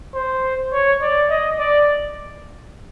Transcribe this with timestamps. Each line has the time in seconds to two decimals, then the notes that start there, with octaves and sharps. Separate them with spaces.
0.14 C5
0.73 C#5
1.01 D5
1.30 D#5
1.59 D5